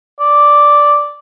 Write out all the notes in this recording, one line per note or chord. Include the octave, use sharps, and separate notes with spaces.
D5